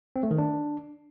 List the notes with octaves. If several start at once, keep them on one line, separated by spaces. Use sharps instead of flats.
C4
A3
D#3
D4